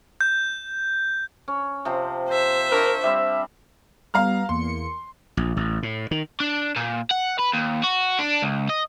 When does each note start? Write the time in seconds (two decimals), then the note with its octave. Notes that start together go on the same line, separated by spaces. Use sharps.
0.21 G6
1.48 C#4
1.85 C3 F3 C4
2.28 C5 E5
2.72 D4 A#4 C#5
3.03 G3 C4 E5
4.14 G3 B3 F5 A#5 F6
4.49 E2 A#3 C6 C#7
5.37 A#1
5.57 A1
5.83 A2
6.11 D#3
6.40 D4
6.76 A#2
7.11 F#5
7.39 B4
7.54 D#2
7.83 F#4
8.19 D4
8.42 C#2
8.69 D#5